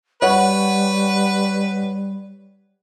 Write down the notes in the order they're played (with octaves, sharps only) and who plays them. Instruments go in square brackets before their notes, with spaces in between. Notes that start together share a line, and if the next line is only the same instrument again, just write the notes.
[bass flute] G3 [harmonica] B4 [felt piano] C#5 F#5